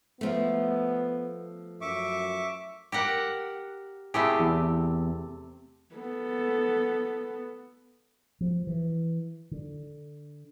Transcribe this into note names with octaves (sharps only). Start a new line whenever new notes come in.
F3 A3 B3
F#2 E5 C#6 D6
G4 A#4 F#5
C3 A3 E4 G4 G#4
E2
B3 A4
F3
E3
D3